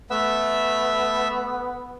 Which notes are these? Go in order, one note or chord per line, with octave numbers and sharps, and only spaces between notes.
A3 B3 E5 E6